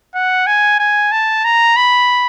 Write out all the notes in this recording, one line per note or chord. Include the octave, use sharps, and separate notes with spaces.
F#5
G#5
G#5
A5
A#5
B5